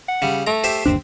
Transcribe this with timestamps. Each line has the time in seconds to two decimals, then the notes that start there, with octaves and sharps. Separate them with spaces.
0.08 F#5
0.22 C#3 G3
0.47 A3 A#5
0.64 G4 C5 E5
0.86 G1 D#2 C4 D4